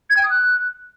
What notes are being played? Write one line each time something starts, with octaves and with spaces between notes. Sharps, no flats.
G#6
G5
D#6
F#6